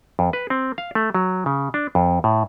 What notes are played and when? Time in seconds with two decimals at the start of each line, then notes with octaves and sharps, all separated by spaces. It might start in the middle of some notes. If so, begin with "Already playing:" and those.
0.19 F2
0.33 B4
0.50 C4
0.78 F5
0.95 A3
1.15 F#3
1.46 C#3
1.74 D4
1.95 F2
2.24 A2